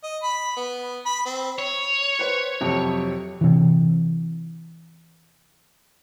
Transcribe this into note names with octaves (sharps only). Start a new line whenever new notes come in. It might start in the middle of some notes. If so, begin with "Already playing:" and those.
D#5
B5
B3
B5
C4
C#5
B4 C5
F2 C3 F#3
C3 E3